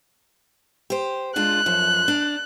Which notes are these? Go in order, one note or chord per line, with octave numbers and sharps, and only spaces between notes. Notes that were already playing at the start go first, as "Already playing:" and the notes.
G4 C5
G#3 D4 F4 F#6
F#2 F3
D4